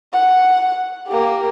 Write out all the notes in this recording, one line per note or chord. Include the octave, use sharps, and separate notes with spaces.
F#5
A#3 G4